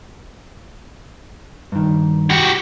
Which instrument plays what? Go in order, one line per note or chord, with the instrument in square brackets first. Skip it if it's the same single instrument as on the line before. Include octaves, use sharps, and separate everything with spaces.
[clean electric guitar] G2 D#3
[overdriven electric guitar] F#4 G4